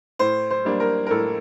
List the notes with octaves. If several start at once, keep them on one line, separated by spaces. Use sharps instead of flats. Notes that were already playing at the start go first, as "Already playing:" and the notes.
A2 C5
C5
G3 A#3 D4
A#4
A#4
A2 A4